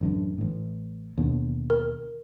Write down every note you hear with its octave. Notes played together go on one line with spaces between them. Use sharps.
A1 F#2 D3
A1 A2
D#2 B2 D3
A#4